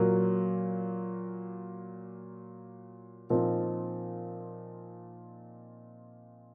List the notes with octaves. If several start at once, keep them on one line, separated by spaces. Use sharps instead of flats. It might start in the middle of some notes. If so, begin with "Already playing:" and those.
Already playing: A#2 F#3 A#3
A#2 F3 C4 D#4